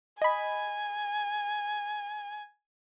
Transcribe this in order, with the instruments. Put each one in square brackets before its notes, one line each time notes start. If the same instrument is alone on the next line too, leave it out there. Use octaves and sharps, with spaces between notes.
[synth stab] D#5 B5 [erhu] G#5